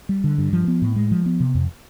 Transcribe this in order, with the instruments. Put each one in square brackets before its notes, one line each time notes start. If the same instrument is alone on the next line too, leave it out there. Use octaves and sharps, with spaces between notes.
[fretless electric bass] G3
D3
G2
F3
B3
A2
G#3
F3
B3
C3
F2